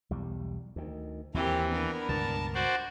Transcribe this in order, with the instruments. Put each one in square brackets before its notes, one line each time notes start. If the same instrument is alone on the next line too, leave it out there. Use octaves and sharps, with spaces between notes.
[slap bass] B1 E2 G3
D2 D#3
[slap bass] D#2 [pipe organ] E3 [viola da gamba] C4 G4 A#4
[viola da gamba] B3 D4 A#4
[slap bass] C#2 G2 B2 [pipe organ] A5
[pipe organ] F#4 C5 D5